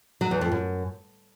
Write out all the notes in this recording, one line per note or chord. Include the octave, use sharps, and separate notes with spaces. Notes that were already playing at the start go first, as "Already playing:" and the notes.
F#3
E2
F2
F#2